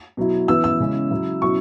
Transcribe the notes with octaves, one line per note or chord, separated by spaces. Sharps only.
B2 F#3 E4
E3 B3 E4 E6
E6
C#3 G#3 C#4 E4
C#3 F#3 E4
B2 F#3 C#4 E4 C#6